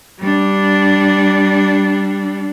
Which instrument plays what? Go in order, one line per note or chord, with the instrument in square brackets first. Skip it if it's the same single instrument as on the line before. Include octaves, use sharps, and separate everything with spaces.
[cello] G3 D4